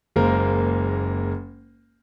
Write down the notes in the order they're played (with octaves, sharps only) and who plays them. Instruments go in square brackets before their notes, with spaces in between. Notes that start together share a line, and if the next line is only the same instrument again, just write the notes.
[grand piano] F#1 G#3 A#3 A#4 C5